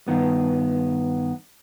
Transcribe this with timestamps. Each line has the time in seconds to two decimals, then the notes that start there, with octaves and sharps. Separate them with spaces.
0.08 G2 D#3 B3